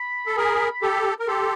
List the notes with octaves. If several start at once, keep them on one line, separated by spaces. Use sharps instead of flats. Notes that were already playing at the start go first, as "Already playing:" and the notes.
Already playing: B5
A4
G#4 A#4
G4 A4
A#4
G4 A4 C6